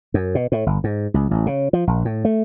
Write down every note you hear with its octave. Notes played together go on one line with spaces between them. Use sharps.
F#2
B2
A2
G1
G#2
C#2
A1
C#3
F3
A#1
A2
A3